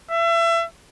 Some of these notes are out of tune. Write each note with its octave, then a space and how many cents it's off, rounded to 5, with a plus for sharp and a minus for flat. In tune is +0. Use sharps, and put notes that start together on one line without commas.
E5 +30